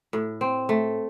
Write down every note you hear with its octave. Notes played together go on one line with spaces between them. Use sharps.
A2
C4
A3